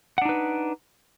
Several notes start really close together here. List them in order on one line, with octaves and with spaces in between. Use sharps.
F#5 D4 D#4 B4